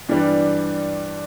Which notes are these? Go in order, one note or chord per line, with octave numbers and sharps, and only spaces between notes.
G2 E3 G3 D4